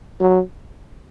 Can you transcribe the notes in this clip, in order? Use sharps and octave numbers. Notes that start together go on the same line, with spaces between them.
F#3